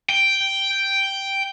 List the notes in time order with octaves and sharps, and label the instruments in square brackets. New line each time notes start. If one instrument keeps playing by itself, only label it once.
[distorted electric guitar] G5